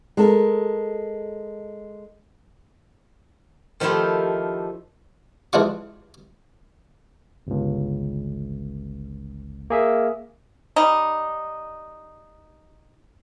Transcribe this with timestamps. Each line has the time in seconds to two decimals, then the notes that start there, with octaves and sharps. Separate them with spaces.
0.17 G#3 A4 A#4
3.80 D#3 F3 A3 E4 F4 G4
5.53 E3 G#3 D4 F4 C#6
7.47 G1 C#2
9.70 A#3 G#4 E5
10.76 G3 D#4